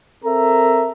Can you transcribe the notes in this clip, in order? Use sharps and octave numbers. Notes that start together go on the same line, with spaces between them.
C4 A4 A#4 E5 A#5